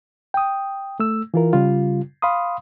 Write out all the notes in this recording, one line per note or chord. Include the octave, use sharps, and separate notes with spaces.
G5 D#6
A3 E6
E3 F4 A#4
C#3 G3 F4
F5 B5 C6 D#6